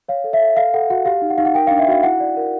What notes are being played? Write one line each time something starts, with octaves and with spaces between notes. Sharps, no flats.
C#5 F5
A4
E5
A4
A4 F5
A4 F#5
F#4 F#5
G4 F5
D#4
F#5
D#4 F5
F#5
A#4 G5
D4 F5
E5
F#4 F5
E4 F#5
D5
A#4